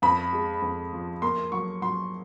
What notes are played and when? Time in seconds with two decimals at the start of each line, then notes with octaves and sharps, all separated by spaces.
0.02 F2 B5
0.33 G#3
0.62 F2
0.93 F3
1.22 A#3 C6
1.52 F#3 C#6
1.82 F#3 C6